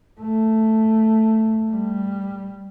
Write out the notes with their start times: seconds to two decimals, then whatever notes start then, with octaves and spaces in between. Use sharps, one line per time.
0.21 A3
1.71 G3